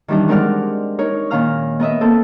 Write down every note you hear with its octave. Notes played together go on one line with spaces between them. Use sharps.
D#3 E3 G3 D4 D#4
G#3 C4 A#4 D5 F#5 F6
D#4 A#4 C#5
A#2 D#3 C#4 F5 A#5 F6
B3 A#4 D#5 E5
A#3 C4 A4